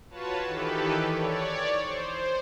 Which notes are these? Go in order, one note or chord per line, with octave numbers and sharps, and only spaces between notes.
F4 F#4 B4 C#5 A5
D#3 E3 G4 A4 B4
C#5 D5
C5